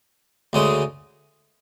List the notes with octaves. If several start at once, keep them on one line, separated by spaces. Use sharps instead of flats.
D2 C#3 G#3